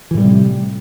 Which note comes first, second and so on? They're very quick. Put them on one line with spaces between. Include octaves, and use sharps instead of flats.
E3 A2 G3 C3